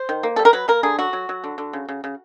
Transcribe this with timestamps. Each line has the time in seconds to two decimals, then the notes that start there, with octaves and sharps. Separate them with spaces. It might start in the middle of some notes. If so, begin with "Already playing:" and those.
Already playing: C5
0.09 D#3
0.23 A#3
0.36 G3 A4
0.45 A#4
0.53 F#3 B4
0.68 A#3 A#4
0.83 D3 G#4
0.99 F#3 F#4
1.13 F#3
1.29 F#3
1.44 D3
1.58 D3
1.73 C#3
1.89 C#3
2.04 C#3